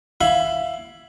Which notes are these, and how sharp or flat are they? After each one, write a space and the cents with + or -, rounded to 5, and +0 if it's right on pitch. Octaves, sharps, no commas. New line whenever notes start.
E4 +20 F5 +20 B5 +0